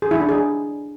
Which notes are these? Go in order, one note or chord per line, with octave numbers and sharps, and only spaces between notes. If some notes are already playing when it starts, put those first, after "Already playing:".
G#4
E4
D4
G#4